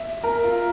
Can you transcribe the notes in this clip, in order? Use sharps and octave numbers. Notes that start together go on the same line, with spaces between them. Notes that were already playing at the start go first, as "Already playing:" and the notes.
Already playing: E5
A#4
F4